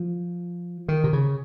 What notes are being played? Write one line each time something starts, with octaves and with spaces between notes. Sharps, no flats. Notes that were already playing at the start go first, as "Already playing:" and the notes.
Already playing: F3
D#3
C3
C#3